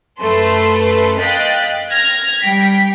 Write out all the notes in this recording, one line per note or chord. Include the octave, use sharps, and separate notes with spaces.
F#2 A3 A4 B4 C6
D#5 F5 G5 F#6 A6 B6
F6 G#6 A#6
G3 G5 B6